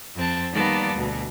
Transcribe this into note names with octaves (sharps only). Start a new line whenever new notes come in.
F2 C4 A5
D#3 G3 A#3 B3 D5 A5
D2 B2